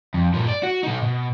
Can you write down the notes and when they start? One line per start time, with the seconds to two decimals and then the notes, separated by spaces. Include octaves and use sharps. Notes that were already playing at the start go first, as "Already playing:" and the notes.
0.14 F2
0.33 G2 A#2
0.48 D5
0.63 F#4
0.83 B2 D#4
1.03 B2